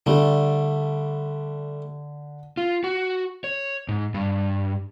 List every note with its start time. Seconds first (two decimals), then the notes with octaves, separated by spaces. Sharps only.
0.06 D3 G3 A3
2.57 F4
2.84 F#4
3.44 C#5
3.88 G#2
4.14 G2